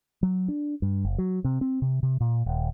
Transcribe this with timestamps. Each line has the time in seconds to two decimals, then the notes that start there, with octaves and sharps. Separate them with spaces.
0.23 F#3
0.48 D4
0.82 G2
1.05 F#1
1.18 F#3
1.44 C3
1.61 C4
1.82 C3
2.03 C3
2.20 A#2
2.46 D#1